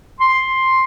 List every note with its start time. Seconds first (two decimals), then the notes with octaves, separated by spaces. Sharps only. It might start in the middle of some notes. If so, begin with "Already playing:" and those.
0.20 C6